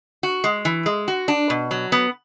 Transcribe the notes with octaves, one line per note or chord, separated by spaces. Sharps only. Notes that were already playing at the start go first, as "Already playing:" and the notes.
F#4
G#3
E3
G#3
F#4
D4
B2
F#3
B3